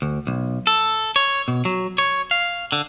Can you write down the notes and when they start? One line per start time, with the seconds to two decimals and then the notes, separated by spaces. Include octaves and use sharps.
0.02 D2
0.27 B1
0.67 A4
1.16 C#5
1.48 B2
1.65 F#3
1.98 C#5
2.31 F5
2.72 D3